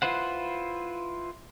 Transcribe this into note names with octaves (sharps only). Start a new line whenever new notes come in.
E4 F4 B4 C5 F#5